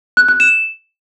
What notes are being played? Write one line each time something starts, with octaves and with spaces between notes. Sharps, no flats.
F#6
F#6
E7